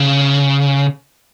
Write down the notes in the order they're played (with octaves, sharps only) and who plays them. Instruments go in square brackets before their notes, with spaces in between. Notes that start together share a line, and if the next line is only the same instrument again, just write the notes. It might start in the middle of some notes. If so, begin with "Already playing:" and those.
Already playing: [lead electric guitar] C#3